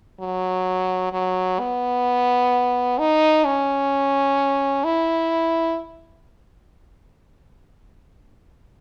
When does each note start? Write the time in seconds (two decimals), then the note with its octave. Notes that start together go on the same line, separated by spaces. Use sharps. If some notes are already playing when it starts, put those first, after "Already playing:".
0.20 F#3
1.13 F#3
1.60 B3
2.99 D#4
3.45 C#4
4.84 E4